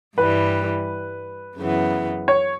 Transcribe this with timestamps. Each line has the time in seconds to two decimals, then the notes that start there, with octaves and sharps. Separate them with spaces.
0.17 G2 E3 G3 B4
1.58 F#2 C#3 E3 B3
2.28 C#5